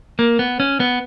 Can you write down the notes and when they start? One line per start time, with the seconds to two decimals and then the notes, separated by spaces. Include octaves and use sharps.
0.19 A#3
0.39 B3
0.60 C#4
0.80 B3